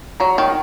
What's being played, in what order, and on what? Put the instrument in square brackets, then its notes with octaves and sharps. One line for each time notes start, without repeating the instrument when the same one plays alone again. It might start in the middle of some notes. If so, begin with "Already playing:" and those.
[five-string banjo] F#3 [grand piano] A#5 C#6
[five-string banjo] D#3